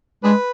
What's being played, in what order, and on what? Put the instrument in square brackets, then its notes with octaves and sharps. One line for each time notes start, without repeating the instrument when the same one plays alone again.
[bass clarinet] G#3 [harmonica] D4 G#4 B4